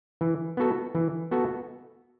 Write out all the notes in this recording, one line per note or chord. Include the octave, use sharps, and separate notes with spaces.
E3
B3 F#4 A4
E3
B3 F#4 A4